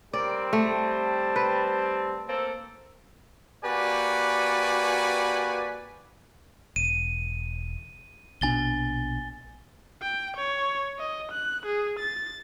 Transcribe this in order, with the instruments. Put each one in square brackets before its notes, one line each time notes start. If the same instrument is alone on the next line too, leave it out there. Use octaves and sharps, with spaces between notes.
[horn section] G3 C4 [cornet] A#4 [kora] D5
[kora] A3 [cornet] A5
[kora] B4
[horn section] A#3 C4 A4
[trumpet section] A#3 F#4 G4 B4 D5 G#5
[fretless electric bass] E1 [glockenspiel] D#7
[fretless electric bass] A#1 B2 D4 [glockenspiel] G#5 A6 G7
[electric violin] G5
C#5
D#5
F#6
G#4
A6